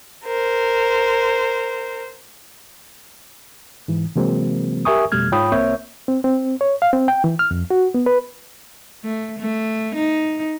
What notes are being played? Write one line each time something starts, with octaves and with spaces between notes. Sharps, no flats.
A#4 C5
G#2 E3
C3 E3 F#3 G#3 A#3 C4
G4 A#4 E5 G#5 C#6 D#6
F2 B2 G3 A3 F6 G#6
G#2 F4 C#5 G5 B5 D#6
C2 A#3 C4 C#5 E5 G6
C4
C4
C#5
F5
C4
G5
E3
F6
F2
F#4
B3
B4
A3
A3
D#4